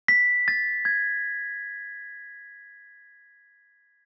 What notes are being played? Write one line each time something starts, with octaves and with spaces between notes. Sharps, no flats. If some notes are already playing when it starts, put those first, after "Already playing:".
B6
A6
G#6